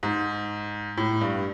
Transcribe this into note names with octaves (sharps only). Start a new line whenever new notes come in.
G#2
A2
G2